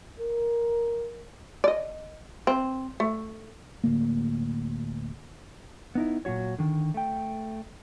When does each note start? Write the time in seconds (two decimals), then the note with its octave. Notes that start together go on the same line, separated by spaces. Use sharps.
0.20 A#4
1.64 D5 D#5
2.47 C4
3.00 A3
3.84 D1 D2 A#3
5.95 B3 D#4 E4
6.25 A#2 F#3 F#4 C#5
6.59 D3 D#3
6.94 A3 G5